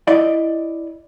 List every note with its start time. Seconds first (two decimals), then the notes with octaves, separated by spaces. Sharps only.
0.07 E4 D5 D#5